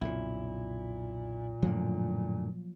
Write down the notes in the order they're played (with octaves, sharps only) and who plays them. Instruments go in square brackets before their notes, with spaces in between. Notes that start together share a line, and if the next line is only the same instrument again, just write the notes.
[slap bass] B1 F2 C#3 [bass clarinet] A#2 [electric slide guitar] E4
[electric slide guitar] F#2 A2 D3 [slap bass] F3 F#3 A#3